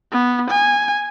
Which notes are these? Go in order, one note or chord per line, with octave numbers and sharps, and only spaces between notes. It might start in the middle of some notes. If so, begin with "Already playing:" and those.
B3
G#5